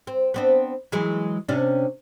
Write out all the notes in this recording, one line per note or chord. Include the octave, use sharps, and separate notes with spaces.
C4
B3 C4 D4
E3 F#3 G#3
C3 C#4 D4